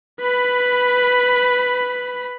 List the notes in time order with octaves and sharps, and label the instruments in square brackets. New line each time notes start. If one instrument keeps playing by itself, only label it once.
[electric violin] B4 B5